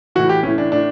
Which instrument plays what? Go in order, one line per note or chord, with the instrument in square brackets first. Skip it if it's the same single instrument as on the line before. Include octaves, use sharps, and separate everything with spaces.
[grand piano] A2 E3 F#4
G4
A2 E3 C#4
D4
A2 D4